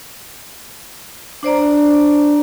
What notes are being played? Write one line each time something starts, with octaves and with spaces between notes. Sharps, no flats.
D4 C5 D5 A#5